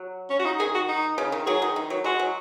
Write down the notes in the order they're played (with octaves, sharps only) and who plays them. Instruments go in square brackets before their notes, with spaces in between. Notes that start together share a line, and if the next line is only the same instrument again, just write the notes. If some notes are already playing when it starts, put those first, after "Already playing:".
Already playing: [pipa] F#3
[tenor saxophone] C#4
F#4
D#4
[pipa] D#3 [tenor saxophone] G#4
[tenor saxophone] F#4
D#4
[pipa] C#3
D#3
[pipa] F#3 [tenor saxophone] G#4
[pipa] D#3
D#3
F#3
[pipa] G#3 [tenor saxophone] F#4
[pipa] F#3